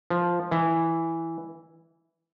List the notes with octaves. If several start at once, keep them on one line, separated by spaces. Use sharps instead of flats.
F3
E3